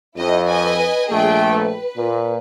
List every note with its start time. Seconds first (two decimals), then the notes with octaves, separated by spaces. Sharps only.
0.16 F2 E4 D#5
0.47 B4 D#5 G#5
1.10 A#1 A3 G#4 G5
1.49 B4
1.96 A#2